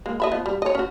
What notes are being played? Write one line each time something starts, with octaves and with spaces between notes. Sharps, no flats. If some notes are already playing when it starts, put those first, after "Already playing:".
G#3 A#3
D#5 E5 B5
F3 B3
G3
C#5 D#5
C#4 F#4